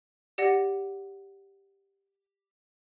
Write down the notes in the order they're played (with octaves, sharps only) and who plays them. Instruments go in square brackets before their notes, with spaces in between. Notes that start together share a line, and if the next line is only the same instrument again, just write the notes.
[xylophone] G4 D5 F#5 A#6